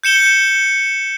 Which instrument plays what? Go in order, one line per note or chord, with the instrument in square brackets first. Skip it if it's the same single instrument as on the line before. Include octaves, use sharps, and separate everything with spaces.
[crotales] G6 C#7 E7 G7